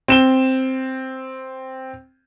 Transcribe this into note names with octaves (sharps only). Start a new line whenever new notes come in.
C4 E7 G7